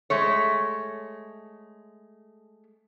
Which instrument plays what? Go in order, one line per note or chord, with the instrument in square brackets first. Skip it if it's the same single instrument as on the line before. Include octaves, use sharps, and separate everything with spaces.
[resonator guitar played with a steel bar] G#3 A3 C#5